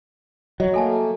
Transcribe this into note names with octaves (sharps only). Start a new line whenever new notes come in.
F#3 D#5
A3 A#3 A4 G#5 A5